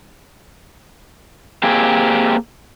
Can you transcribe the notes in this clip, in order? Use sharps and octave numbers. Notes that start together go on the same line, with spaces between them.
A#3 C4 G4 G#4